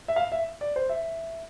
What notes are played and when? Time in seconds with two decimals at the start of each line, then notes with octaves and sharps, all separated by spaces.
0.08 E5
0.16 F5
0.32 E5
0.61 D5
0.76 C5
0.89 E5